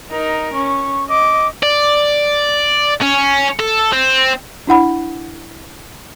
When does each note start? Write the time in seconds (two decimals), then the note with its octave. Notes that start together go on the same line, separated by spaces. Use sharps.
0.11 D#4 A#4
0.54 C#4 C#6
1.09 D#5 D6
1.63 D5
3.02 C#4
3.59 A4
3.93 C4
4.67 D4 E4 F#5 B5